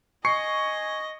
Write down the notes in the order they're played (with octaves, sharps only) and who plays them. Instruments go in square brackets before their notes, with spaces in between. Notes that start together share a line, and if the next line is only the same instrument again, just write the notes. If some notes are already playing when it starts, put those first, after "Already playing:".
[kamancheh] D#5 [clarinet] G#5 [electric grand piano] C#6 C7 C#7